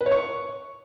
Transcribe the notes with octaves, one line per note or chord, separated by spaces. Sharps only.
B4
C#5
C#6